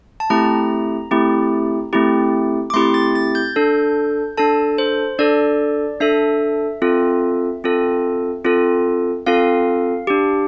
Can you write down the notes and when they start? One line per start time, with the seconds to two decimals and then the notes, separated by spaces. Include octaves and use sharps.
0.20 A5
0.30 A3 C4 E4 G4 A#5
1.11 A3 C4 E4 G4
1.93 A3 C4 E4 G4
2.70 D6
2.74 A3 C4 E4 G4 C6
2.94 A6
3.15 A6
3.35 G6
3.56 D4 A4
4.37 D4 A4 A5
4.78 C5
5.19 D4 A4 D5
6.00 D4 A4 E5
6.82 C4 F4 A4
7.64 C4 F4 A4
8.45 C4 F4 A4
9.26 C4 F4 A4 F5
10.07 D4 G4